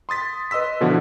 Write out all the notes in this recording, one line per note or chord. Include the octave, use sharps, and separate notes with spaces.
C6 D#6 A6 B6
B4 D#5 C6 E6 B6
B2 D3 E3 F3 B3 F#4